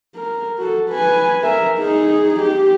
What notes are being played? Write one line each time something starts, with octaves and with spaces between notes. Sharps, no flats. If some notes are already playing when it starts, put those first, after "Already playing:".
A#4
F#4 A4
B4 G#5
A#4 E5
D#4 G#4
G4